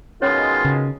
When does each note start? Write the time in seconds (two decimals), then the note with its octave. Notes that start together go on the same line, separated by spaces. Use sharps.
0.22 B2 D#3 G#3 C#4 F4 C#5
0.65 C#3